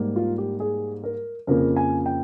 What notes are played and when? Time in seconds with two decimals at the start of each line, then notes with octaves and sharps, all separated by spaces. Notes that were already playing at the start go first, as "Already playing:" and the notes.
Already playing: G#2 G3 A#3
0.16 F4
0.38 G4
0.60 G#4
1.04 A#4
1.47 F2 C#3 F3 A#3 A#4
1.76 G#5
2.06 G5